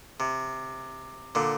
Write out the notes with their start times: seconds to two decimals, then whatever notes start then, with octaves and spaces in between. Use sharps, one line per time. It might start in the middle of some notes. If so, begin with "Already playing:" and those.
0.20 C3
1.35 A#2 D3